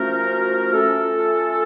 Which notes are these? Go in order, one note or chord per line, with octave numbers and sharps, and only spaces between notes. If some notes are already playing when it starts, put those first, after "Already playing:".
Already playing: F3 A3 C#4 F#4 A#4
A3 C#4 F4 A4